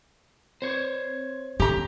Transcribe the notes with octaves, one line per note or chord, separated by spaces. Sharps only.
C4 C5 C#5
D#3 G4 A#5